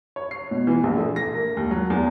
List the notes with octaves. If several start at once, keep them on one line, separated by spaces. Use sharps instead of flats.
C#5
C7
B2
E3
A#1
A3
A#6
A#3
D#2
F#3
E2